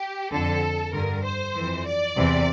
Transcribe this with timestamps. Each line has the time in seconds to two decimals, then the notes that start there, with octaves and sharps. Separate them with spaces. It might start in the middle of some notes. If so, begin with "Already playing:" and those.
Already playing: G4
0.31 F2 D3 A4
0.93 G2 D3 A#4
1.24 C5
1.55 F2 E3
1.86 D5
2.17 E2 C3 E3